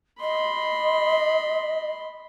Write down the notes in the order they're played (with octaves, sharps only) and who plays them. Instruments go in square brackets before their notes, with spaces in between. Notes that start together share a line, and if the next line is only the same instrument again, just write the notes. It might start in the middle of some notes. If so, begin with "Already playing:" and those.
[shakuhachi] D#5 [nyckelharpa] B5 C6